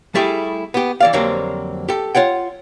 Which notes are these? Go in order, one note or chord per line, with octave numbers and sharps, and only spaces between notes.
G3 A3 E4 G4 G#4
B3 G4
E3 D5 F5
F2 D3 F#3 G3 A#3 C4
G4 A4
F4 C#5 F#5 G5